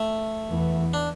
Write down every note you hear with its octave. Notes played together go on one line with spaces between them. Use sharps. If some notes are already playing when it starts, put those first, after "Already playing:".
Already playing: A3
E2 E3 B3
D4